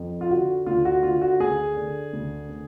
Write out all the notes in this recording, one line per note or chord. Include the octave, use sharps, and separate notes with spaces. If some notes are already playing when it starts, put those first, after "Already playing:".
Already playing: F2
F4
D3 F#4
D2 F4
F#4
D3 F4
F#4
D2 G#4
D3
D2
D3